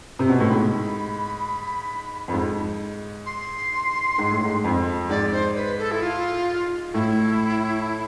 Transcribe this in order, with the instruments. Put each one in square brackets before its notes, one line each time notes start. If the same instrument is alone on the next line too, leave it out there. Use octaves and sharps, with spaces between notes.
[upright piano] C3
B2
A2
[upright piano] G#2 [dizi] B5
[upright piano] F2
G#2
[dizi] C6
[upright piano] G#2
A2
G#2
F2
[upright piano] G#2 [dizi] D5
[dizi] C5
B4
A4
E4
F4
[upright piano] A2 [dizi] E4